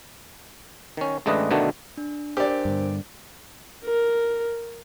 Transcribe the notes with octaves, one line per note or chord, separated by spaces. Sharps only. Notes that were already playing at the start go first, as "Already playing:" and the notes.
D#3 C#4
A1 G#3 A3 D4 B4 D#5
D2 B2 D#3 A3 B3 D4
D4
D4 G4 A#4 C5 D5
G2 D3
A#4